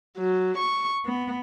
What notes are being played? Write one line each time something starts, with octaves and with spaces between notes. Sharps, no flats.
F#3
C#6
B3